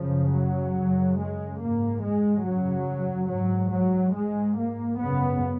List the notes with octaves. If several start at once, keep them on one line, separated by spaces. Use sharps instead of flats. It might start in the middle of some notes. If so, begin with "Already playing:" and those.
Already playing: F#2 C#3 F3
F#3
F#2 C#3
G#3
G#2 A#3
G#3
F#2 C#3 F#3
G#2 F#3
F#3
G#2 G#3
A#3
F#2 C#3 B3